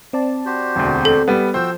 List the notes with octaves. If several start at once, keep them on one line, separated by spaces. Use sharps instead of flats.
C4 D5 A5
F#4 G4 C5
E1 D2
A4
G3 B3
F3 F#4 C5 G5 E6